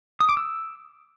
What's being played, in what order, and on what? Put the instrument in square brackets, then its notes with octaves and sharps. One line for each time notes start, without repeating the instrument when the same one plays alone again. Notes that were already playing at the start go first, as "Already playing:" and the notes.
[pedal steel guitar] D#6
D6
E6